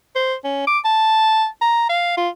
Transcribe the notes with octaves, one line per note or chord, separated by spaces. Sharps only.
C5
C#4
D6
A5
A#5
F5
F4